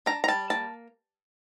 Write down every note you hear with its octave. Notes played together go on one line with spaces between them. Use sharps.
D4 A#5
A#5
G3 A5
A#3 A5